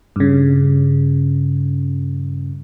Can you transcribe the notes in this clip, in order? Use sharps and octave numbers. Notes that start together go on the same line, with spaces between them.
G2 C#3